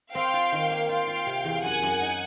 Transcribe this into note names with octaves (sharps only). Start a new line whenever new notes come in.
C4 F5 G5
F4
D#3
A#3
F4 F5 G5
F4
C3
E2
F#2 F#5 G#5
F#2
D#4